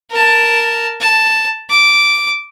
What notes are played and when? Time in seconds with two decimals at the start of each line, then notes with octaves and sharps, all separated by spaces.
0.11 A#4 A5
1.00 A5
1.70 D6